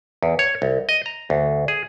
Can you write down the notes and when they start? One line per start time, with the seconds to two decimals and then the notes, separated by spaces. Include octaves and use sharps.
0.23 E2
0.39 C#5
0.62 C2
0.89 D#5
1.06 A#5
1.30 D2
1.68 G#4